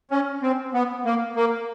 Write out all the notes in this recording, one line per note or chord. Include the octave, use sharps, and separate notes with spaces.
C#4
C4
B3
A#3
A#3